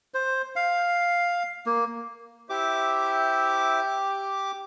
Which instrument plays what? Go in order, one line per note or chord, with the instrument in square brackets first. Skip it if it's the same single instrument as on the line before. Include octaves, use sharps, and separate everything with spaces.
[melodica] C5
F5
A#3
[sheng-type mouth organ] E4 C5 E5 [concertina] G4 D6